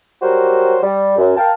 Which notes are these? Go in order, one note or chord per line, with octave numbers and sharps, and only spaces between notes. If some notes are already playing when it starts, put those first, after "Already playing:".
F#3 G3 F#4 G4 A#4 C5
G3
F#2
A#4 F5 G5 A5